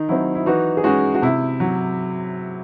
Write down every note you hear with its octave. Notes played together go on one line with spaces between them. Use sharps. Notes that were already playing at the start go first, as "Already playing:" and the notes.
Already playing: D#3 D#4
F#3 C4 E4
E4
E3 D#4 F#4
G#4
G#3 C#4 D#4 F#4
F#4
C3 E4
F#3